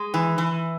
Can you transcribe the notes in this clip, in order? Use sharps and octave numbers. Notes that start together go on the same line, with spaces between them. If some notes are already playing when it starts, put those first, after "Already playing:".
Already playing: G#3
E3
E3